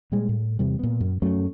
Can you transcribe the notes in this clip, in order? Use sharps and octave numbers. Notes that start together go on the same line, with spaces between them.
A#2 G3 G#3
A2
E2 C3 G3
A#2 B3
F#2
F#2 F#3 A3 C#4